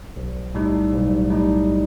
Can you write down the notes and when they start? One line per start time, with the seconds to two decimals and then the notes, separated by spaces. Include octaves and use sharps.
0.16 B1
0.55 A2 G3 D#4
0.93 B1
1.30 A2 G3 D#4